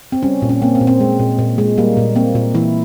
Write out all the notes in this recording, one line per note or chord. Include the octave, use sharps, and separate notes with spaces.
C4
G3 C#4
A#2
C#4
A#3 C4
C4
A#2
C4
G#3
A#2
A#2
G#3
G3 A#3
A#2
A#3 C4
A#2
E3 E4